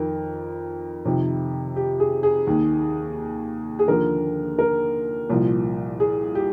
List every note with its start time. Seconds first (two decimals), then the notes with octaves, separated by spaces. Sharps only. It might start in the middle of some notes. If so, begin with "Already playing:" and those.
Already playing: F2 D#3 A#4
1.05 F2 C3 D#3
1.76 G4
2.00 G#4
2.23 G#4
2.47 D#2 D#3
3.79 G#4
3.88 D#2 D3 F3 A#4
4.59 A#4
5.30 C2 A#2 F3
6.00 G#4
6.35 G4